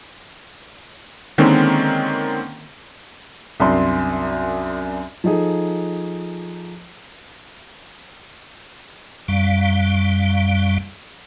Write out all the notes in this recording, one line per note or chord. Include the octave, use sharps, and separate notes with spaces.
D3 D#3 G#3 A#3 C4 C#4
C2 F#2 D4 C6
F3 D#4 G#4 A4
F#2 G3 F5